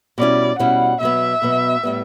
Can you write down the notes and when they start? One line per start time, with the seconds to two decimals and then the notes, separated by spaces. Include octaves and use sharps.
0.18 B2 G3 C#4 E4 D5
0.59 B2 G3 C#4 E4 F#5
1.00 B2 F#3 B3 E5
1.42 B2 F#3 B3
1.83 A2 G3 B3